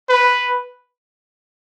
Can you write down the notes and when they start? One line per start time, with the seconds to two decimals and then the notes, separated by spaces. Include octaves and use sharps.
0.09 B4